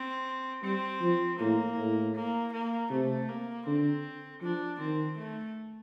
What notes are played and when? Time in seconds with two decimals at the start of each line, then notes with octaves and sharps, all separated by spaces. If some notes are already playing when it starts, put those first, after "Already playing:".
Already playing: C4
0.64 G3 C4
1.01 F3
1.39 A2 A#3
1.77 A2
2.15 A#3
2.53 A#3
2.90 C3 A3
3.28 A#3
3.66 D3 C4
4.42 F3 D4
4.79 D#3 C4
5.17 A3